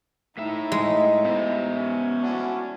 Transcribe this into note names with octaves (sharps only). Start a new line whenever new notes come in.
A2 D#4 E4 E5
G#3
B3 C5 E5
C#4
D4 E4 F#4